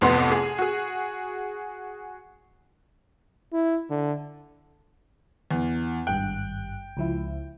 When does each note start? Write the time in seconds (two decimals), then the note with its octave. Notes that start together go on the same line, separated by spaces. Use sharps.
0.01 A1 F2 C3 B3 F#5 C6
0.31 G#4
0.58 F#4 G#4
3.53 E4
3.90 D3
5.51 E2
6.07 G#1 G2 G5 F#6
6.97 C#2 F3 E4